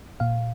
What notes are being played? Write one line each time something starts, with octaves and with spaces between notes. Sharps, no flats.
A#2 F5